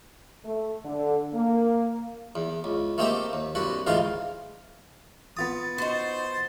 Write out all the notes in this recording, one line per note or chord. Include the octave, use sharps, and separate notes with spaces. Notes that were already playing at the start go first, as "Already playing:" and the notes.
A3
D3
A#3
E2
C#2
A3 A#3 C4 D#4 G4 E5
D#2
C2 G2 F#4 F#5 B5
D2 G#2 E3 D#4 F4 F5
B3 F4 D#6 A6
D#4 F#4 C5 C6